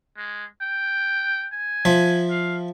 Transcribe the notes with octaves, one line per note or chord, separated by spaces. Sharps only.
G#3
G5
G#5
F3 E5
F5